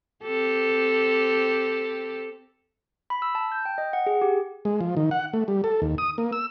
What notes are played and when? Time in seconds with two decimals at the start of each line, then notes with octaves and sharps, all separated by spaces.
0.23 C4 G4 A4
3.10 B5
3.22 E6
3.35 A5
3.52 G6
3.65 G5
3.78 D#5
3.93 F#5
4.07 G#4
4.22 G4
4.65 G#3
4.81 F3
4.97 D#3
5.11 F#5
5.33 A3
5.48 G3
5.64 A4
5.82 D#2
5.98 D#6
6.18 A#3
6.32 E6